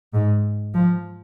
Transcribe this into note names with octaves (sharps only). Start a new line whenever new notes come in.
G#2
F3